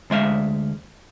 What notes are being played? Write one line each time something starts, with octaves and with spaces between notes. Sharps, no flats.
D2 G#3 E5 F5